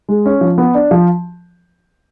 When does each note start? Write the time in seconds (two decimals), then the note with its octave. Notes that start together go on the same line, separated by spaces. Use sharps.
0.09 G#3
0.26 C#4
0.41 F3
0.58 B3
0.75 D4
0.91 F3